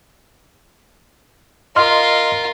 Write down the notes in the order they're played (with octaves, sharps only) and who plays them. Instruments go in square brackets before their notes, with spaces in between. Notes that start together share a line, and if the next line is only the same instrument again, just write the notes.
[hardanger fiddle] F4 A#4 [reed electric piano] D#5 C6 F6